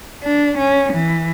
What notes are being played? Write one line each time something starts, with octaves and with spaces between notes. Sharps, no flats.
D4
C#4
E3